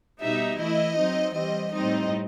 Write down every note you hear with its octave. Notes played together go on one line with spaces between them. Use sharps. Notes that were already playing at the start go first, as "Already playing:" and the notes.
B2 G3 D#4 E5
E3 A3 E4 D#5
F#3 C4 D#4
E3 G3 C4 D#5
A2 G3 C4 D#4 D#5